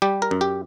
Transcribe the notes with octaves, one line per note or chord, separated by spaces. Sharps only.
G3 G4
A#4
F#2
G4